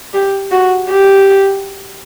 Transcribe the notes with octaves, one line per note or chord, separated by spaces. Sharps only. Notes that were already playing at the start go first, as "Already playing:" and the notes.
G4
F#4
G4